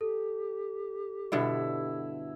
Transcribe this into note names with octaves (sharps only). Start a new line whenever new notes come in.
G4 A4
G2 B2 D3 E4